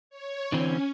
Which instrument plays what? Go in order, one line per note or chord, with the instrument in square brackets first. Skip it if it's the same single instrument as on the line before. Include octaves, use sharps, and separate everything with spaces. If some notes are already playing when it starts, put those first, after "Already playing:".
[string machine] C#5
[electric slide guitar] D3 E3 C4 [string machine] C#4